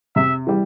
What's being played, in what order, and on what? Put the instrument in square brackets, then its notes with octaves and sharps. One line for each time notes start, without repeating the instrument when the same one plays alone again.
[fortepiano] C3 [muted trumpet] E5
[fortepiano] E3 G3